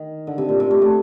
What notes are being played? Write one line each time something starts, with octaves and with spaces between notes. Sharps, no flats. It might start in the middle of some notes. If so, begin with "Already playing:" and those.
Already playing: D#3
D3
C3
A#2
C3
A3
A3